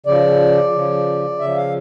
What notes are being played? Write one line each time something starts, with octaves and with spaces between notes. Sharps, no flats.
C#3 F3 D5
C#3 F3
C#3 F3 E5
F5